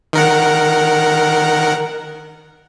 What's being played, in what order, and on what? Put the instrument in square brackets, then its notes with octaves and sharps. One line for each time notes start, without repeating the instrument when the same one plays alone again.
[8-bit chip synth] D#3 A#4 F#5